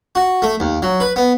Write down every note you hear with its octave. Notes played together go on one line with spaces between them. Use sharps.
F#4
A3
D#2
F#3
B4
B3